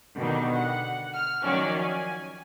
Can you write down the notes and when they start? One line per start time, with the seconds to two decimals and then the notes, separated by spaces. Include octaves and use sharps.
0.17 B2 D3 D#3 G3
0.56 F#5
1.14 F6
1.43 D#3 F3 F#3 C#4 F#4 D5
1.79 G#5